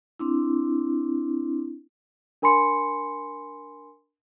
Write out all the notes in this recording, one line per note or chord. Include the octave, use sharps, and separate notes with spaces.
C4 D4 E4
D4 A#4 G#5 B5 C6 C#7